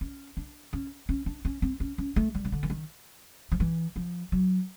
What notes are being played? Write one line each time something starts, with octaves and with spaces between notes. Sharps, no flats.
C#4
D4
C#4
C#4
D4
C#4
C4
C#4
C#4
A3
G3
C#3
D3
E3
D#3
F3
E3
F3
F#3